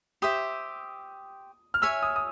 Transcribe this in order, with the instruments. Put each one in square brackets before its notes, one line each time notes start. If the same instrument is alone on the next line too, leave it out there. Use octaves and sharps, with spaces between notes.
[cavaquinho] G4 C5 E5 [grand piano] D#6
[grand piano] F6
[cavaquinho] C#5 E5 G#5 [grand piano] E6
[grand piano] D#6
D#6